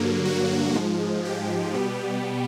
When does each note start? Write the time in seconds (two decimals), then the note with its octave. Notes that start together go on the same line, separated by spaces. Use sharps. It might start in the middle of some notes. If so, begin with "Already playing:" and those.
Already playing: G2 D3 F#3 A#3
0.25 F#4
0.75 G#2 F3 G#3
1.25 G4
1.74 B2 G3 B3